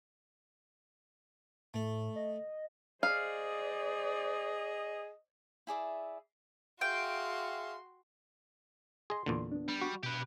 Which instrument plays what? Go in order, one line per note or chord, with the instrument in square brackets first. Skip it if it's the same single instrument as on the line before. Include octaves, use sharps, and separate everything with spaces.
[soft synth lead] A2 [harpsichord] A3
[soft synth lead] D#5
[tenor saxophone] G#4 [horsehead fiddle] C5 D5 [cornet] D#5 [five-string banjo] F5
[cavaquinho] E4 G#4 D5 E5
[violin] F#4 C6 [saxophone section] G#4 E5 F5 [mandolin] G5
[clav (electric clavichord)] G#4 D#5 [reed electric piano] C6
[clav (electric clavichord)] E2 A#2 D3
[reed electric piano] B3 D4
[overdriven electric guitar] G3
[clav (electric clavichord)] F#4
[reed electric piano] B2 [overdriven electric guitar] G4 B4